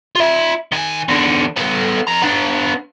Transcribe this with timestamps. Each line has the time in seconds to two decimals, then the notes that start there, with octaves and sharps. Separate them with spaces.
0.15 F4 E5
0.72 D#3 G#5
1.08 E2 D3
1.56 B3 A4
2.07 F2 A#5
2.22 B3 D4